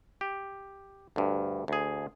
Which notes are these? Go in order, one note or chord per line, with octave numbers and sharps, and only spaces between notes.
G4
D2 G2
D2 G#4